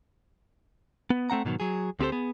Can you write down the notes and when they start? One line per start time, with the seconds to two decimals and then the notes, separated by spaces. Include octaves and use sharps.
1.10 B3
1.30 A3 C4 F#5 A#5
1.45 G#2 B2 D#3 F#3
1.60 F#3 G#4
1.99 D2 C4 G4 A4 C5
2.12 B3 G#4